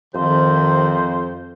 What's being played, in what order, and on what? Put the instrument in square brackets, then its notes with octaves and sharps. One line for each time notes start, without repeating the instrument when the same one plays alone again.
[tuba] F2 [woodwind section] C3 C5 [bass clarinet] D#3